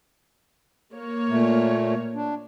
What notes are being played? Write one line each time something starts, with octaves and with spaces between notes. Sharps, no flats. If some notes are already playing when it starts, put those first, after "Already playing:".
A#3 C#5
A#2 A3
D4